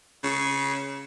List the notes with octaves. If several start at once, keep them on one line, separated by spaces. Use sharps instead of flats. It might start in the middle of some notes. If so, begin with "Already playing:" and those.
C#3